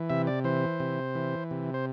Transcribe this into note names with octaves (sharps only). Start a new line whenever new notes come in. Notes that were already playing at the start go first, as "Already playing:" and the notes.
Already playing: E3
C3 E5
D5
E3 C5
C3
E3
C3
C5